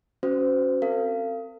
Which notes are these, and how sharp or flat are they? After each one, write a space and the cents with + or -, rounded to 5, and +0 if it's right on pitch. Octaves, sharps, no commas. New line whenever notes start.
C#4 +0 F#4 +0 C5 -35
C4 +0 A4 +45 F5 -25